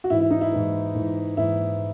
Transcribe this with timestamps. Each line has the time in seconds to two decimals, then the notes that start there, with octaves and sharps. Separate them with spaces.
0.04 F#4
0.10 G#2 E3 E4
0.21 E4
0.31 D#4
0.41 E4
0.52 G#2 E3
0.95 G#2 E3
1.37 G#2 E3 E4